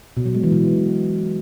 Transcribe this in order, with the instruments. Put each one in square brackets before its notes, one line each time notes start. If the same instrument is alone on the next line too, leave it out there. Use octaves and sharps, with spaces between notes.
[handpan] B2
F#3
G#3
E3
B2